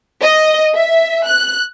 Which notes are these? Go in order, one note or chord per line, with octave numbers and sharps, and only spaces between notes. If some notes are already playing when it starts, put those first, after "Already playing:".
D#5
E5
F#6